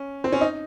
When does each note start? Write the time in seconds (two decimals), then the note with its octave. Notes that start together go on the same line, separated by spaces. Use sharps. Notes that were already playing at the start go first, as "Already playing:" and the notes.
Already playing: C#4
0.24 C4
0.32 C#4
0.41 D#4